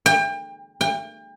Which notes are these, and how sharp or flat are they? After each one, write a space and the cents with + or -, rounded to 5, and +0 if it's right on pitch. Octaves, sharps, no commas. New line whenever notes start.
G5 +30
G5 +35